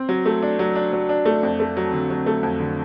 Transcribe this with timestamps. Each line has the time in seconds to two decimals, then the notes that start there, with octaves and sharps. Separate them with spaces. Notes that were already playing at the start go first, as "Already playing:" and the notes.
Already playing: C4
0.09 F#3
0.26 A3
0.43 D4
0.59 F#3
0.76 D4
0.93 F#3
1.09 D4
1.26 A3
1.43 F2
1.60 A3
1.77 F#3
1.93 D3
2.10 F#3
2.26 A3
2.43 F2
2.60 D3